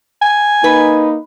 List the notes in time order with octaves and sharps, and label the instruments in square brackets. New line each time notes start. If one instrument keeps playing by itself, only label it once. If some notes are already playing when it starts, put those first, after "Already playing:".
[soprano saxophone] G#5
[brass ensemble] A#3 D#4 [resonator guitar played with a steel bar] B4